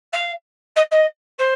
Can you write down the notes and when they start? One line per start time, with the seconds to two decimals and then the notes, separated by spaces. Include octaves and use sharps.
0.12 F5
0.76 D#5
0.91 D#5
1.38 C5